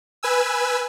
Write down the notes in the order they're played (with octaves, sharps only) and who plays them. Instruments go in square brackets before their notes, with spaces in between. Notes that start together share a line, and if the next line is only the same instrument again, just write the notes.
[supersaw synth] B4 G#5 E6